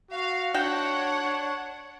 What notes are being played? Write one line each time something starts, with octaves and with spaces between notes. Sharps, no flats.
F#4 F5
D4 F#4 C#5 F#5 G5